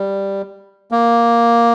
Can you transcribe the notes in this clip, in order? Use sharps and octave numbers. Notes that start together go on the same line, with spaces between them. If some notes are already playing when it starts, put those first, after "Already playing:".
Already playing: G3
A#3